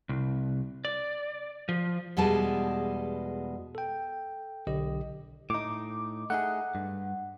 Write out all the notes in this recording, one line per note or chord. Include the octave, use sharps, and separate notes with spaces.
C2
D5
F3
E2 B2 G3 G#3 A5
A4 G5
B1 D3 G4 D#5
A2 D#4 D6
A3 D#4 G#4 F#5
G2